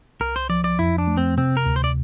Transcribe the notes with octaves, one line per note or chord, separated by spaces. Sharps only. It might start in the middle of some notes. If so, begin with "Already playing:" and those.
C2 A#4
C5
F3 D5
D5
F2 E4
D4
A3
C4
C3 C4
A#4
D2
C5
D5